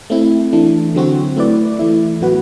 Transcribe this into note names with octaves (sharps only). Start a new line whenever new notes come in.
A3 C4 E4
E3 A3 D4
D3 F#3 C4 F#4
A3 E4 B4 D5
E3 A3 E4
A2 F#3 B3 F#4 B4